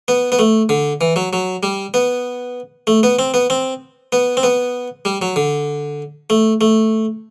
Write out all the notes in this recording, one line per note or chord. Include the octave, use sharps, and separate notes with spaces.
B3
B3
A3
D3
E3
F#3
F#3
G3
B3
A3
B3
C4
B3
C4
B3
C4
B3
G3
F#3
D3
A3
A3